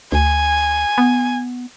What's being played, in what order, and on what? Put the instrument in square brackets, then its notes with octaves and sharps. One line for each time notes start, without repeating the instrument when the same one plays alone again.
[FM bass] D2 [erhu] G#5
[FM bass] B3